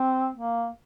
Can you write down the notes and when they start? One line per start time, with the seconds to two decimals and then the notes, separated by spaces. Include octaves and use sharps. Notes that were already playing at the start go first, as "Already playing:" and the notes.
Already playing: C4
0.35 A#3